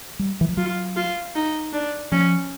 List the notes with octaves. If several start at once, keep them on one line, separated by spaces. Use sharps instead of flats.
G3
E3
F3
F#3 F4
F4
D#4
D4
F3 C#4